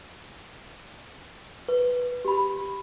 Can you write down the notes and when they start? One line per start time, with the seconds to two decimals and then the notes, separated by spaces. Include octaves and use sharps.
1.68 B4
2.25 G4 B5